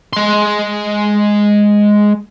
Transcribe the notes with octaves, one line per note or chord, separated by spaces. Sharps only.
G#3 C6